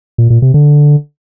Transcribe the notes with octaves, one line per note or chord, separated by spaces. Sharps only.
A#2
A#2
C3
D3